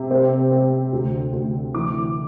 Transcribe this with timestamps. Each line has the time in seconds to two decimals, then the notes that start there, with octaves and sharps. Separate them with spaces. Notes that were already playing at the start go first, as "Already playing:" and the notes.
Already playing: C3
0.11 C4
0.51 C4
0.93 D2
1.33 D2
1.74 E3 D6